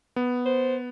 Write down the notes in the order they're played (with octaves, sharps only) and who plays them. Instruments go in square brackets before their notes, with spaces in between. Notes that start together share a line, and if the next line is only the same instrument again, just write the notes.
[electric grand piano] B3
[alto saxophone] C5